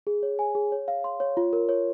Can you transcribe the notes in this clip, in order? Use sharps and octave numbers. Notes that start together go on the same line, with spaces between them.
G#4
C#5
G#5
G#4
C#5
F5
C6
C#5
F4
A#4
C#5